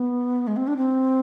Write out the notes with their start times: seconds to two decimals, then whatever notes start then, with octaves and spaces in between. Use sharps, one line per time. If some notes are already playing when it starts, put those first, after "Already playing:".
Already playing: B3
0.47 G#3
0.56 C4
0.67 D4
0.77 C4